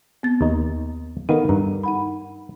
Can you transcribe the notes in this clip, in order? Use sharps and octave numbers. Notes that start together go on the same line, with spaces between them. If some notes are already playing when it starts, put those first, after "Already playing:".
B3 C4 A6
D#2 D#4
D#3 B3 D#4 A4 A#4 F5
G2 A#5
D#4 F#5 B5